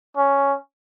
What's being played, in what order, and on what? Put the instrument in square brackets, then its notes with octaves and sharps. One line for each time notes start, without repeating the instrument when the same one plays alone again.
[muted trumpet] C#4